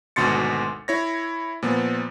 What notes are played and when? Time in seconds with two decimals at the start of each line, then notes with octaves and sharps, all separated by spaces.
0.16 G#1 D2 B2 C6 A6 C#7
0.88 E4 C#5 A#6
1.63 A#2 F3 B3